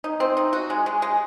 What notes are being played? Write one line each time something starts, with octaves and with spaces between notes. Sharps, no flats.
D#4
C4
D#4
F#4
G#3
G#3
G#3